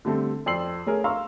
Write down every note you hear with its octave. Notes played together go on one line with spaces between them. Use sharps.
D3 G3 A3 C4 A4
F2 D5 C6 E6 C7 F#7
A3 C#4 G#4 A#4
F5 A#5 C6 C#6 E6